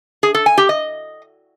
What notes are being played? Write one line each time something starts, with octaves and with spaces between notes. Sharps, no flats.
G#4
A4
G#5
G4
D#5